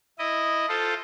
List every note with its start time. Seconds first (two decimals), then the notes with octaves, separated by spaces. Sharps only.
0.19 E4 D#5
0.69 F4 A4 C5